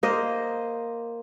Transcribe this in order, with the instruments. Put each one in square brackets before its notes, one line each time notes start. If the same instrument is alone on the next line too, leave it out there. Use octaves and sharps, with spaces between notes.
[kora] A#3 C5 D#5